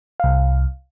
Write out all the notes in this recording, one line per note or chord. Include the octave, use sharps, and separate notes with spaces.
C2 F5